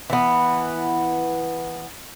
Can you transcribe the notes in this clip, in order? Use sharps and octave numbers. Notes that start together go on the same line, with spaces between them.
E3 B3